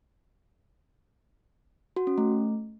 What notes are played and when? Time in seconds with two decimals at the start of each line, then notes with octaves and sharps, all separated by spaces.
1.96 F#4
2.07 C#4
2.18 A3